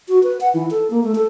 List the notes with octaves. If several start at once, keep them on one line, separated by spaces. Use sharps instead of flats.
F#4
B4
F#5
E3
A4
A#3
A3
A4